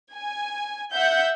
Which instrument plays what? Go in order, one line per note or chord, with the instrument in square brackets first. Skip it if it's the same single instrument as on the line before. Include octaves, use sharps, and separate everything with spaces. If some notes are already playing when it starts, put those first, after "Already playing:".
[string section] G#5
E5 F#5 G6